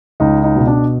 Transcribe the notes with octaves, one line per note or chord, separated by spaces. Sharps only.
C#2 D#4
D#4
B2
D4